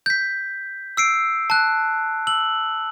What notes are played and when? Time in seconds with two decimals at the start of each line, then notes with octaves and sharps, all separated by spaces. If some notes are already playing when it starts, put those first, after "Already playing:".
0.06 G6 B6
0.97 E6 C7 D7
1.50 A5 F#6
2.27 E6 F#7